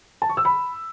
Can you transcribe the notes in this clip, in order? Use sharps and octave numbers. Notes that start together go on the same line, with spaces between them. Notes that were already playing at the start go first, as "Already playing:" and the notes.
A5
C#6
E6
B5